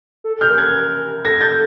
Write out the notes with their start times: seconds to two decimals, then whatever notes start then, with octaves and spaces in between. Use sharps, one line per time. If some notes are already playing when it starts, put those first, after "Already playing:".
0.24 A4
0.41 F6 G6
0.49 A#4
0.57 F#6 G#6
0.75 A#4
1.24 A4 G#6 A#6
1.41 G6 A6